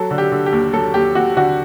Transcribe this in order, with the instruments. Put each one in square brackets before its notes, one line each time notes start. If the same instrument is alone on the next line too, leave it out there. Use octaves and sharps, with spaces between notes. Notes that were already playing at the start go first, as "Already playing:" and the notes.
Already playing: [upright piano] F#3 [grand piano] A4
[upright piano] D3
[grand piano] G4
[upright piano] D3
[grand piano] G4
[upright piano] D#2
[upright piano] F#3 [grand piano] A4
[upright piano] D#2 [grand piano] G4
[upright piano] D#2 [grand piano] F#4
[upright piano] D3 [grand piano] F#4